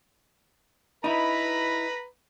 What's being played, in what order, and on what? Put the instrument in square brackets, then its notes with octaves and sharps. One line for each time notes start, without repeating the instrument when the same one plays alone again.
[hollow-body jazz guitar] D#4 E4 [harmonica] B4 A#5 B5